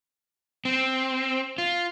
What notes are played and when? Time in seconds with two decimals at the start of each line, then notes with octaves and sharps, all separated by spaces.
0.65 C4
1.58 F4